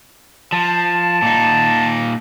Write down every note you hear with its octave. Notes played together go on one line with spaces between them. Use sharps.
F3 A5
A#2 D#4